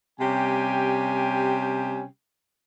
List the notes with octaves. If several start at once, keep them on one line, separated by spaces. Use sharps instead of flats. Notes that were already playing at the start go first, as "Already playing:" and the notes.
C3 G3 C#4 G4 G5 G#5